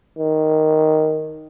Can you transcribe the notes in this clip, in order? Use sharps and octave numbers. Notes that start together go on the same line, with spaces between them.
D#3